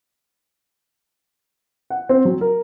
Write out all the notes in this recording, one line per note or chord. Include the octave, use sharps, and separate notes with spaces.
F#5
C4
F#3
A#4